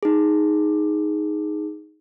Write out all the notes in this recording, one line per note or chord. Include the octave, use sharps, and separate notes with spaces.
D#4 G#4